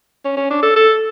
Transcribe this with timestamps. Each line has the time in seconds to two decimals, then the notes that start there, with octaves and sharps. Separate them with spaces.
0.25 C#4
0.37 C#4
0.50 D4
0.63 A4
0.76 A4